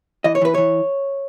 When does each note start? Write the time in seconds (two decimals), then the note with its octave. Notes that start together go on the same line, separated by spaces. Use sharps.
0.24 E3 D#5
0.35 C#5
0.41 E3 B4
0.54 E3 C#5